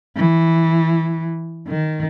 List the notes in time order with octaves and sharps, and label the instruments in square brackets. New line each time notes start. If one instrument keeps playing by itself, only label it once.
[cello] E3
D#3